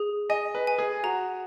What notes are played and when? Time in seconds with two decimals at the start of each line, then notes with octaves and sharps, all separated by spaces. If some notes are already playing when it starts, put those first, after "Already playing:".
Already playing: G#4
0.30 D#5 G#5
0.55 B4
0.67 G#5
0.78 G#4
1.03 F#4 A#5